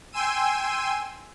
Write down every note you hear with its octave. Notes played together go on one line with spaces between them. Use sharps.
G5 G#5 C6 E6 D#7